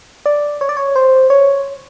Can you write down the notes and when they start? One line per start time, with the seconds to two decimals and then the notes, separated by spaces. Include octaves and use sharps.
0.26 D5
0.61 C#5
0.69 D5
0.77 C#5
0.96 C5
1.30 C#5